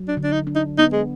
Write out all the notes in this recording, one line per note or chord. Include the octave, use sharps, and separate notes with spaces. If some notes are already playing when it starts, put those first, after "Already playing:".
Already playing: F#3
D4
D3
D4
D#4
D4
D#4
B3 D#4
G#3